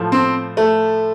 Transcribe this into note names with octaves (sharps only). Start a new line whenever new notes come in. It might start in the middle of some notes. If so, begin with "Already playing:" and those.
Already playing: A2 F3
C4
A3